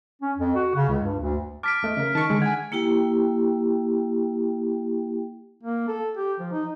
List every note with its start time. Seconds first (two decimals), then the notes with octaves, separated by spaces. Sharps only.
0.22 C#4
0.37 F2
0.55 F#4
0.75 C#3
0.89 C#2
1.02 G2
1.20 D2
1.63 A5 D6 F6 B6 D7
1.83 E2 A3 D#5
1.97 C#3 A#4
2.15 D#3 A5 C#6
2.30 D3 G#3
2.42 F#5 G#5 G#6
2.72 A#3 E4 G4 G5
5.63 A#3
5.88 A4
6.17 G4
6.39 F3
6.52 D#4